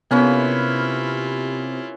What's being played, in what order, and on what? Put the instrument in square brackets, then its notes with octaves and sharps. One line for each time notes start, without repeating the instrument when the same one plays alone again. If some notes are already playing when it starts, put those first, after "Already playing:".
[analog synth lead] C3 [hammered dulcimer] A#3 C#4 B4 [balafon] B3 [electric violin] E4 F4